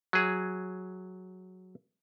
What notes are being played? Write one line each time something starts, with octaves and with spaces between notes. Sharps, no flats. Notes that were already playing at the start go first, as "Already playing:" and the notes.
F#3 G#4